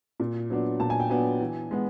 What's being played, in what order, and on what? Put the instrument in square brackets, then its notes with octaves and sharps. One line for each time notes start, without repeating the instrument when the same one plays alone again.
[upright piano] A#2
F#3 B3 D4
A#2 A5
G#5
G5
F#3 B3 D4 G#5
E3
G#3 B3